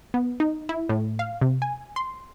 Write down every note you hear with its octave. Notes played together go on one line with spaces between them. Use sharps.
B3
D#4
E4
A2
F5
C3
G#5
C6